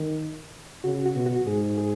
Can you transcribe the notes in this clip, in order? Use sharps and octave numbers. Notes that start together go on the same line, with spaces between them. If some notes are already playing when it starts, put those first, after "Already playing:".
Already playing: D#3
C#3 F#4
F#4
B2
F#4
G#2 G#4
G#4